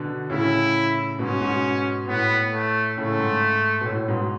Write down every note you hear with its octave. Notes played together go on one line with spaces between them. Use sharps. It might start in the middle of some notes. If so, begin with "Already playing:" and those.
Already playing: B2 D3
A2 C#3 E4
G#2 B2 C#4
G#2 B2
A2 B3
A3
A2 C#3 A3
G#2
B2
A2
G#2 B2